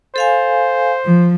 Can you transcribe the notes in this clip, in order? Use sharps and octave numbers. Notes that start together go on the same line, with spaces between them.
A4 C5 F5 G#5
F3